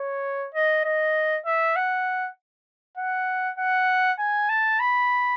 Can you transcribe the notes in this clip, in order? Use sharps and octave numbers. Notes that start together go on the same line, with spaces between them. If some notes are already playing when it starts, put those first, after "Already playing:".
Already playing: C#5
D#5
D#5
E5
F#5
F#5
F#5
G#5
A5
B5